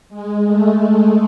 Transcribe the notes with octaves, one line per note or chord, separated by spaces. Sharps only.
G#3
A3